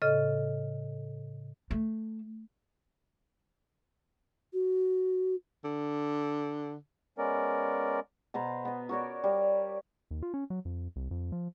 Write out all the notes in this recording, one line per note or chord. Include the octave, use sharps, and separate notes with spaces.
A2 C#3 A4 D#5 F6
A3
F#4
D3
G#3 B3 C#4 A#4 D5
B2 B4 C5 A#5
B3 D#5
F#4 A#4 C#5 D5
G3 F5
D#2
F4
C#4
F#3
F2
C2
F2
F3